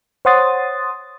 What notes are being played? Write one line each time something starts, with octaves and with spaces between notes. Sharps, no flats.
C5 C#5 F#5 C6 D#6 A6